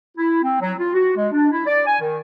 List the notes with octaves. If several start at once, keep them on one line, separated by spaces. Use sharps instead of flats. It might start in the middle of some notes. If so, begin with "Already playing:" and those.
E4
C4
F#3
F4
F#4
G#3
D4
E4
D5
G#5
D#3